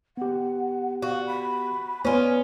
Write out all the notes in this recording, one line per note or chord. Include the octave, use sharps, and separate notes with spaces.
B3 G4 F#5
F#4 F5
B5
B3 C#4 F4 G#5